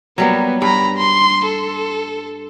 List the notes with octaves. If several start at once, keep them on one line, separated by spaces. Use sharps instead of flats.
F#3 G3 A#3 B3
G2 A#5 B5
C6
A4